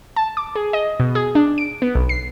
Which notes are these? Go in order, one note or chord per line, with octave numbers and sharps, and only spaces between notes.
A5
D6
G#4
D#5
B2
G#4
D4
D7
B3
B1
C7